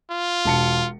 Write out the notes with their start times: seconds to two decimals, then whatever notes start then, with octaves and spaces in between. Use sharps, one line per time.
0.10 F4
0.45 E1 A5 C#7